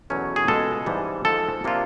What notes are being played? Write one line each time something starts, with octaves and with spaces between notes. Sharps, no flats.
E2 B2 F#3 A3 C#4
G#4
C#2 B2 G#3 A4
G#2 E3 G3
G#2 F3 G#3 A4
C3 F3 A#3 D4 F4